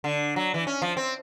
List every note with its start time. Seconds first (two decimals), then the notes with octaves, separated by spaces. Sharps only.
0.04 D3
0.36 F#3
0.54 E3
0.67 C#4
0.82 F3
0.97 C4